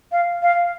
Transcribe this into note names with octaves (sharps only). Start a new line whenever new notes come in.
F5
F5